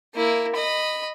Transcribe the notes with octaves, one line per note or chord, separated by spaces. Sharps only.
A#3 E4
D#5 B5